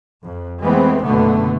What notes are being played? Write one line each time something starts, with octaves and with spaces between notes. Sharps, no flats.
F2
E3 G#3 A3 B3 C4
F#1 B2 D3 A3 B3